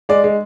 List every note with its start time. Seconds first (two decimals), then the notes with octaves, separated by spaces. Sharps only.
0.09 G#3 D5
0.24 G#3